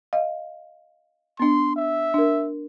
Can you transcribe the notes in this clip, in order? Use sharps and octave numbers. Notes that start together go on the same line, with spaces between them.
D#5 F5
B3 D4 C6
E5
D4 A#4